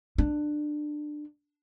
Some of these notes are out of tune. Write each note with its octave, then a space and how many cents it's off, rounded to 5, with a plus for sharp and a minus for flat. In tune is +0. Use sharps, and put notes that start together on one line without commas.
D4 +20